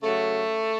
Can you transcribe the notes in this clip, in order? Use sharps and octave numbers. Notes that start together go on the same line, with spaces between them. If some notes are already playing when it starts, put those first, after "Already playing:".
C#3 F#3 A3